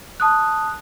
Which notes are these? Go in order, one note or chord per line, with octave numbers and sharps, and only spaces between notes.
A5 D#6 F#6